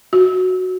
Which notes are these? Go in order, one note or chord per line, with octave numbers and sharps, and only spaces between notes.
F#4